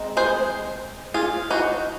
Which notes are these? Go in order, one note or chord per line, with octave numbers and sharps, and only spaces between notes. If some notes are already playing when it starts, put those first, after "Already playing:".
Already playing: G#3 C4 D#4
G#4 C5
F4 G#4
D#4 F#4